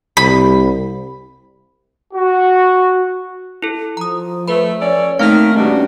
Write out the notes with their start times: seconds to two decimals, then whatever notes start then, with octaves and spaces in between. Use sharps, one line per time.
0.17 C2 B5
2.14 F#4
3.62 E4 A4
3.97 F3 A#5 D#6
4.48 A3 B4 B5
4.79 C#4 A4 C#5 D5
5.19 D#3 A3 A#3 C4 D#4 A#4 F5
5.55 G#2 B2 G3 C#4 D4 F#4